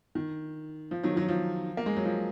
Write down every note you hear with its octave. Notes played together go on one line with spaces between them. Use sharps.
D#3
F3
D#3 F#3
D#3 F#3
F3
A#3
G#3
F#3
F3